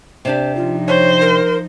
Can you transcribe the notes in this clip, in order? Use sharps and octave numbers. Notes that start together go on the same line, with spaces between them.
C3 D4 G4 C5
F3 D#4 F4
C5 C#5
A#4